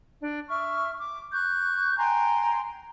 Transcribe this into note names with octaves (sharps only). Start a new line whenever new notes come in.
D4
E5 C#6 F6
D6
C#6 F#6 G6
G5 G#5 A#5 C6